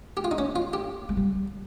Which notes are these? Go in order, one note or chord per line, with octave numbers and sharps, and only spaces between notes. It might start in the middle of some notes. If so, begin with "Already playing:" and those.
G4
F4
D#4
A#3 C#4
F4
G4
G#3
G3